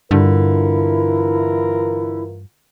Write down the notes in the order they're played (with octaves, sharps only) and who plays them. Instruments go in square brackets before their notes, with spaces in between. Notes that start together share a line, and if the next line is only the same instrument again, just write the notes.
[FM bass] G2 [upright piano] D3 [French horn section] E3 F4 A#4 [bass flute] E4